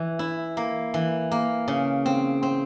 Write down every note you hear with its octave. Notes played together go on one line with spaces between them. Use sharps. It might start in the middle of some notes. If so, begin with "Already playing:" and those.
Already playing: E3
E4
A#3
E3
A#3
C#3
C4
C4